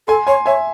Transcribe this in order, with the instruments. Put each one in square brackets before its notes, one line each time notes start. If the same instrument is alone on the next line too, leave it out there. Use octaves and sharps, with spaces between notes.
[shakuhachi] A4 [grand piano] G#5 C6
[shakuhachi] C#5 [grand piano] G#5 C6
[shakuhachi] C#5 [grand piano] E5 G#5